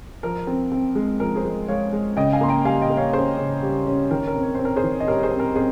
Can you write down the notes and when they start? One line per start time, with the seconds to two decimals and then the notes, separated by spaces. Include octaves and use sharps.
0.23 F3 A#4
0.47 C4
0.72 C4
0.95 G#3
1.20 F3 A#4
1.36 G#4 C5
1.45 G#3
1.68 G#3 C#5 F5
1.92 G#3
2.17 C#3 D#5 G5
2.33 F5 G#5
2.41 A#3 C6
2.49 G5 A#5
2.65 G3 F5 G#5
2.82 D#5 G5
2.90 A#3
2.97 C#5 F5
3.13 C#4 G#4 C5
3.38 C#3
3.63 G3
3.86 C#4
4.11 D#3 A#4
4.27 A#4
4.35 C4
4.43 C#5
4.55 C4 C5
4.65 A#4
4.76 G#4 C5
4.84 D#3
5.00 D#5
5.07 G3 A#4 C#5
5.23 G#4 C5
5.31 C4
5.40 A#4
5.56 C4 G#4 C5